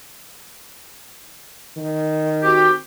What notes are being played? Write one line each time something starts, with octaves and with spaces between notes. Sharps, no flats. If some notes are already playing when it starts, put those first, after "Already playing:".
D#3
C4 F#4 G4